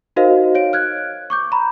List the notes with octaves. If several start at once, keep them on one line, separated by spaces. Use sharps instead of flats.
D#4 F#4 A#4 C5 D#5 F5
C#5 F5 D7
F6 F#6 G#6
C#6 D6 G6
A#5 B5